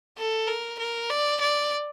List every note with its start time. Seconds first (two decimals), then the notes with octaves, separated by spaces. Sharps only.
0.18 A4
0.47 A#4
0.79 A#4
1.09 D5
1.40 D5